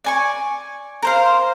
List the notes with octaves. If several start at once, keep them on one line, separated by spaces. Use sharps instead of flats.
D5 G#5 C#6
A#4 C5 F5